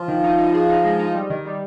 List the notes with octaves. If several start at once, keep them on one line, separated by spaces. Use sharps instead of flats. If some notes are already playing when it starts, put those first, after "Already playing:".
Already playing: F3 F4
D#3
D#4
D#4
G#4
D#4
G#3
D#4
G3
D#3
G3